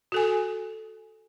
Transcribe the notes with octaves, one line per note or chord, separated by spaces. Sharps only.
F#4 A4 G#5